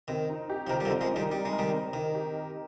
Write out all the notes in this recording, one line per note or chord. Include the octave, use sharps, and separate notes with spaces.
D#3 C4
D#4
G4
F3
D#3 A#4
G3
D3 F3
C4
F3 G#3
D#3 G3 D#4
G3 G4
G#3
A#4
D#3 G3
C4
D#3 D#4
G4
A#4